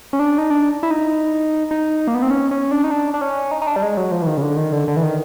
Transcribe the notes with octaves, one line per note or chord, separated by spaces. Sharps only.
C#4
D4
D#4
D4
E4
D#4
D#4
A#3
B3
C4
C#4
C#4
D4
D#4
D4
D4
C#4
D#4
D#4
D4
G3
G#3
F#3
F3
E3
D#3
C#3
D3
D#3
D3
D3
E3
D#3